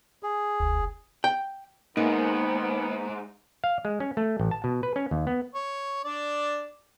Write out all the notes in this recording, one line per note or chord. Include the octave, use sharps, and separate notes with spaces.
G#4
F1 D2
G5
G#2 D#3 A#3 B3 D#4
F5
G#3
C#4
A3
A1
A5
B2
B4
C#4
D#2
B3
C#5
D4 D5